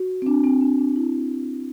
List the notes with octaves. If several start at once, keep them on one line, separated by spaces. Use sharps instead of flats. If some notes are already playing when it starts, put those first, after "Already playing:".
Already playing: F#4
C4
D4
C4
D4
D4
E4